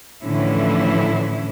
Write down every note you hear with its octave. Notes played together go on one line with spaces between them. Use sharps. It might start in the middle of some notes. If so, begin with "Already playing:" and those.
A2 D3 E3 F3 C#4 E4